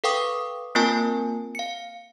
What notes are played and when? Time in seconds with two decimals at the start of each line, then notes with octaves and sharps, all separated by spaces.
0.04 A4 B4 F5 G5 C#6 D#6
0.75 A#3 C4 F4 A#4 G#5 A5
1.55 F5 C#7